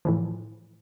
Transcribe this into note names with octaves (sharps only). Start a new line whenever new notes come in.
A2 E3 F3